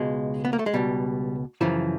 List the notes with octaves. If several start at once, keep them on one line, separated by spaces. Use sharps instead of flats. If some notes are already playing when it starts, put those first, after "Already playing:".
Already playing: C#2 B2 G#3
B3
A#3
A3
G#3
C#2 B2 G3
F#2 C#3 E3 F3